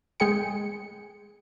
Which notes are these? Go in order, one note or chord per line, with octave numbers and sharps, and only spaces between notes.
G#3 G#4 G5 C#7